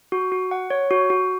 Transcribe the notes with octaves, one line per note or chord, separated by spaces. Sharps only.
F#4
F#4
F#5
C#5
F#4
F#4